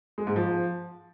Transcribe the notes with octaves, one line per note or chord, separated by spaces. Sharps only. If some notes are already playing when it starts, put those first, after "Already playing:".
G#3
G#2
F3